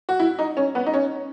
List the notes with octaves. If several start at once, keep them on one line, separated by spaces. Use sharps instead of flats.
F#4
E4
D#4
C#4
B3
D#4
C#4